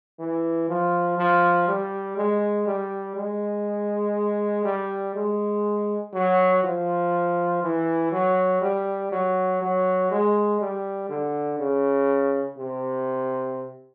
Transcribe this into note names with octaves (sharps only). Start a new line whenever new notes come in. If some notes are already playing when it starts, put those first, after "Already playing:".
E3
F3
F3
G3
G#3
G3
G#3
G3
G#3
F#3
F3
E3
F#3
G3
F#3
F#3
G#3
G3
D3
C#3
C3